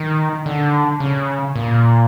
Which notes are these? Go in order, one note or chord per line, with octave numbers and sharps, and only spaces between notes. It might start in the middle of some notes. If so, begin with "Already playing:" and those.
Already playing: D#3
D3
C#3
A#2